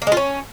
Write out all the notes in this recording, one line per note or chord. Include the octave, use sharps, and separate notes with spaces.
A#3
G#3
F4
C#4